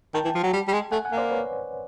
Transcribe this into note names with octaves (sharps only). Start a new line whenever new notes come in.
D#3 G5 A5
E3
F3
F#3
G3
G3
G#3
A3 F#5 G#5
F#5 G#5
A#3
C5 D5
B4 C#5